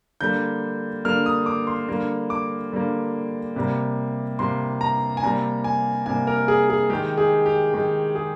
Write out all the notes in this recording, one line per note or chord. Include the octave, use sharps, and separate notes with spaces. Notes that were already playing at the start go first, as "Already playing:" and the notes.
D3 G3 A#3 G6
D3 G3 A#3 F6
D#6
D6
C6
D3 G3 A#3
D6
D3 G3 A#3
C3 G3 A#3
C3 G3 A#3 C6
A#5
G#5
C3 G3 A#3 A#5
G#5
C3 G3 A#3 G#5
A#4
G#4
G#4
D#3 G#3 G4
G#4
G4
D#3 G#3
G#4